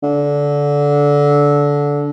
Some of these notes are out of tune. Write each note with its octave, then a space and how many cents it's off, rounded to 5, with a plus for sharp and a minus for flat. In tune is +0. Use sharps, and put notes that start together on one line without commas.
D3 -20